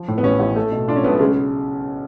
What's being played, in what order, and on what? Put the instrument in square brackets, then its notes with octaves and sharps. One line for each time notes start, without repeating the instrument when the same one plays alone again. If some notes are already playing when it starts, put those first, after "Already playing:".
Already playing: [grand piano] F3
A2
[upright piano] B3
[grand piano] A1 [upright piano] C#4
[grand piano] A1
A3
B2
[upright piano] D4 [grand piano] F4
[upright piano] C#4
[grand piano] B1 [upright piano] B3
[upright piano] A3
[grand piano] C#3 [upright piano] G#3